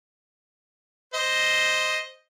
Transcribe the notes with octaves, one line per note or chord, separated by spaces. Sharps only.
C5 D#5